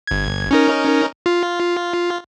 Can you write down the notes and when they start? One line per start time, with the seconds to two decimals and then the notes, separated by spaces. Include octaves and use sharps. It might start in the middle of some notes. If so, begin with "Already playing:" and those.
0.07 G1 G#6
0.51 C#4 D#4 A#4
1.26 F4